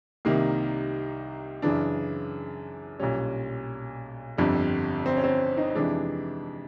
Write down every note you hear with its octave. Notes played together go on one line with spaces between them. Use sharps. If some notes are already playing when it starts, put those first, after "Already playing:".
C2 C3 D#3 G3 A#3
F#2 C#3 E3 D4
B1 A#2 G3 C#4
G1 F2 D3 G3
C4
C#4
C4
D#4
F2 C3 E3 G#3 D4